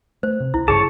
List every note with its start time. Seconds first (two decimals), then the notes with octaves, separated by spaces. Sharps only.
0.23 A3 C5
0.40 C3
0.54 C2 E4
0.68 G#1 G2 C#3 G#4 C#5 A5